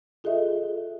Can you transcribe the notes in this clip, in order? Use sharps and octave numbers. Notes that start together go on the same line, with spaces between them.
F4 G#4 A4 D#5 E5